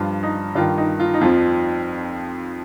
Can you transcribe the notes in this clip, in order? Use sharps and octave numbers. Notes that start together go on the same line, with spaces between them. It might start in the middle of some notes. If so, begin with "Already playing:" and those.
Already playing: G2 F3 F4
D#4
G2 D#3 F4
D#4
F4
D#4
F2 F3 F4